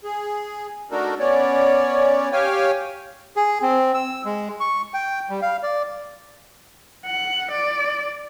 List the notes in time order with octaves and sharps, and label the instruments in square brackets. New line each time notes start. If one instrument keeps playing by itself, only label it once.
[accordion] G#4
A3 D4 D#4 F#4 A4 A#4
B3 C#4 C#5 D5
G4 C#5 F5 G5 G#5
[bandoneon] G#4
C4
E6
G#3
C#6
G5
G3
F5
D5
[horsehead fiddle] F#5
D5